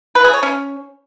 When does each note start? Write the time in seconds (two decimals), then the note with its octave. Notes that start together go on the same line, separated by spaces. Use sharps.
0.15 B4
0.24 G#4
0.34 C#5
0.43 C#4